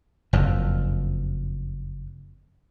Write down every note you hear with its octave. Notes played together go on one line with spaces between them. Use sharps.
F#1 F2